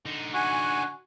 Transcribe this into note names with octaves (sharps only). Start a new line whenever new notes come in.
D3 D#4
F#4 F#5 G#5